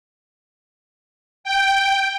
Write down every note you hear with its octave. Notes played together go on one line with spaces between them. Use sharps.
G5